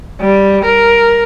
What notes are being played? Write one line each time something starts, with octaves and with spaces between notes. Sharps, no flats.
G3
A#4